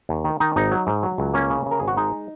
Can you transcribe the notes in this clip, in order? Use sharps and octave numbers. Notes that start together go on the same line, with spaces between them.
D#2
D#3
D#3 D#4
G#1 D#4
F#3
G#2
F#3
C#2
A#3 C#4
C#3
C#3
A#4
G#1 G#4
F#4
G#3 D#4